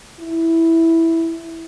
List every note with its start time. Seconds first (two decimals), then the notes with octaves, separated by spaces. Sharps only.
0.20 E4